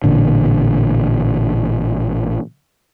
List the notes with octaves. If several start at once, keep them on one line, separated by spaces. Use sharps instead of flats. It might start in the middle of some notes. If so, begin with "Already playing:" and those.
A1 A#2 D3